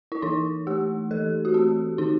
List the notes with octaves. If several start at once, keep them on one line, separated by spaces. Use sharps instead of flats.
E4
E3 D#4
A3 G4
E3 A4
F#4
C4 G4
D#3 D#4